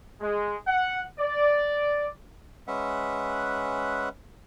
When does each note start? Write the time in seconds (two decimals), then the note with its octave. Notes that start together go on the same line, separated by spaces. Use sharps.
0.21 G#3
0.67 F#5
1.19 D5
2.68 G#3 C#4 B4 E5 F#5